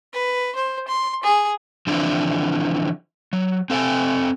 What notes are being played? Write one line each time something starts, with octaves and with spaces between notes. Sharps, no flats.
B4
C5
C6
G#4
D3 E3 F3 C4 D4 E4
F#3
C4 A4 D#5 G5 G#5